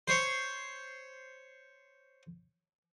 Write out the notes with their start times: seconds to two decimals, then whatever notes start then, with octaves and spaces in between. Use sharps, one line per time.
0.08 C5 C#5